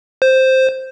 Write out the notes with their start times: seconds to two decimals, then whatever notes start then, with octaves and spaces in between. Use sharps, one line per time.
0.22 C5